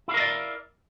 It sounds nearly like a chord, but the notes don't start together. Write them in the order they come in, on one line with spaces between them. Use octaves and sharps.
E4 F5 A#4 D#5 D5